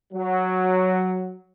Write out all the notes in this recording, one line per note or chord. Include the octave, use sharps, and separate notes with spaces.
F#3